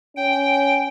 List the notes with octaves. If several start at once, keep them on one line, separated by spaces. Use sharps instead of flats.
C#4 G5